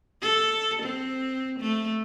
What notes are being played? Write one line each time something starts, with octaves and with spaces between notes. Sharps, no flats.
A4
C4
A3